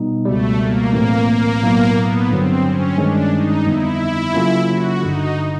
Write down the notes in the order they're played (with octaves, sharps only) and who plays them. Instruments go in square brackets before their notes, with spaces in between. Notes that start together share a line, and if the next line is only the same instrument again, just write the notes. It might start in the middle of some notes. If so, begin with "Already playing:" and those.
Already playing: [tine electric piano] B2 G3 B3 D#4
[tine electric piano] C#2 B2 G3 [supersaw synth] A3
[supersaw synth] A#3
[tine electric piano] B1 A2 E3 A3 C4 [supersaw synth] A#3
[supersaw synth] A#3
[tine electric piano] B1 A2 F#3 B3 E4
[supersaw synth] B3
[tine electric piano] G2 D3 F#3 [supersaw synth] C4
[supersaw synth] C#4
[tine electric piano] G2 D#3 G#3 C#4 [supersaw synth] D4
[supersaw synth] D#4
[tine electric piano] F2 D3 G3 B3 D#4 [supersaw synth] E4
[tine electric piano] C#3 F#3 A#3 C#4 F4
[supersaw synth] F#4
[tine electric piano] G1 G2 D3 [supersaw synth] D#4